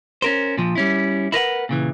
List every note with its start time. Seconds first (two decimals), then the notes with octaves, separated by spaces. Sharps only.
0.22 C#4 A#4 C5
0.57 A#2 F3
0.75 G3 C#4 E4
1.32 E4 A#4 B4 F#5
1.69 A#2 C#3 E3